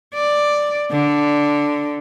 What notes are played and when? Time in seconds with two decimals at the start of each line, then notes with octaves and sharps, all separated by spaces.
0.15 D5
0.92 D3